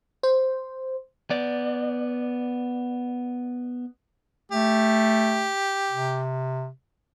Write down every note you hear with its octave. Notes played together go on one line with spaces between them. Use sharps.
C5
B3 D5
A3 G4
C3